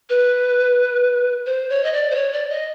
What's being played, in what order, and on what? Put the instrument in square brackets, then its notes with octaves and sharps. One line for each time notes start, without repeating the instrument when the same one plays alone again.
[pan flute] B4
C5
C#5
D#5
D5
C5
C#5
D5
D#5